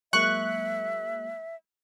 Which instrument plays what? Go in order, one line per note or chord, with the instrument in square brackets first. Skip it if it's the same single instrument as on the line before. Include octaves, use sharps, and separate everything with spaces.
[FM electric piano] F#3 G#3 A#3 [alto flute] E5 [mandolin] C#6 [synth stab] F#6